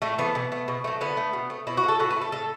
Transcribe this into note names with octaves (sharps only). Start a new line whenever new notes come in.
A2 A3
E3 A3 B3
B2
A3
B2
F#3 A3
D3 B3
A3
B2
A3
B2 E4
F#4
A3 A4
A2 F#4
B3
A3
A4
A2 A4